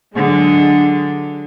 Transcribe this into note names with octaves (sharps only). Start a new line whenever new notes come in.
D3 F#3 G#3